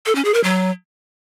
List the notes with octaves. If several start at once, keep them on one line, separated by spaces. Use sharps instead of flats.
A4
C#4
G#4
A#4
F#3